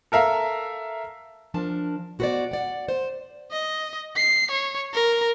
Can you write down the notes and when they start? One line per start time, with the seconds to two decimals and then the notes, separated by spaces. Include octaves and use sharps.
0.12 A4 A#4 E5 F5
1.54 F3 D4 A#4 A5
2.19 B2 F#4 G#4 B4 C5 D5
2.51 D5 F#5
2.88 C5
3.51 D#5
4.16 C7
4.50 C#5
4.94 A#4